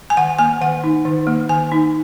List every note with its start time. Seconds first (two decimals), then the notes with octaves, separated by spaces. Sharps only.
0.10 G#5
0.17 D#3 F#5
0.39 A#3 G#5
0.61 D#3 F#5
0.84 D#4
1.05 D#3
1.27 A#3
1.49 D#3 G#5
1.72 D#4